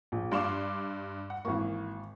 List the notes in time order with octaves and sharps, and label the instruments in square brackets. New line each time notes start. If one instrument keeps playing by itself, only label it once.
[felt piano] A#1
[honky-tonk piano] G2 C6 E7 [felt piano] D5 F5 D6
[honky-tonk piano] F#5
[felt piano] G#1 C#6 [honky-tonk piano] E3 A#3